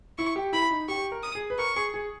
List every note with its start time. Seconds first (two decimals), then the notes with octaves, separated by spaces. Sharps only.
0.18 E4 C#6
0.36 G4
0.53 E4 B5
0.71 D#4
0.88 G4 C#6
1.12 A#4
1.23 D#6
1.35 G#4
1.50 B4
1.58 A#4 C#6
1.76 G#4
1.94 G#4